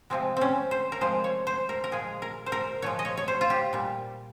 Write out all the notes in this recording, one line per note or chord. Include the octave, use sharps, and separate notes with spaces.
C3 F3 G#3 C4
C4 C#4
C5
A#4
C3 F3 G#3 C5
C#5
C5
A#4
A#4
A#2 F3 G#3 G#4
A#4
C5
A#4
A#2 F3 G#3 C#5
D#5
C#5
C#5
C5
F4
G4
A#2 G3